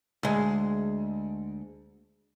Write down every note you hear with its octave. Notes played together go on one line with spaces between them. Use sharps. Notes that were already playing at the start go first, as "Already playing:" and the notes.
D2 G#3